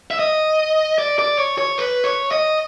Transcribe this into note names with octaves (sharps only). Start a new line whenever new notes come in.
E5
D#5
D5
D5
C#5
C#5
B4
C#5
D#5